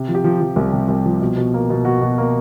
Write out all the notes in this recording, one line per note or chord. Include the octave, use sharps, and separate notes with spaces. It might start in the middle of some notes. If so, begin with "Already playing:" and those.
Already playing: C3
F3
G4
F3
F3
C2
C3
C2
F3
B2
B2
A#3
B2
B2 F#4
B2
A#3